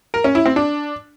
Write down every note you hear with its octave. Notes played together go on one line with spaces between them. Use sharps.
A#4
C#4
E4
C4
D4